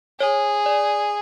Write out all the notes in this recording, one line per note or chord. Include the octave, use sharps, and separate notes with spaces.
G#4 C#5
D5